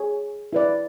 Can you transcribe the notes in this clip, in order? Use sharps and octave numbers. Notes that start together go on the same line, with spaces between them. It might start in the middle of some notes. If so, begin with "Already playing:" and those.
Already playing: G#4 C#5 G#5
E4 B4 D5